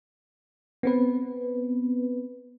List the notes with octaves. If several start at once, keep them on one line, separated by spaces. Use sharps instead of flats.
B3 C4 B4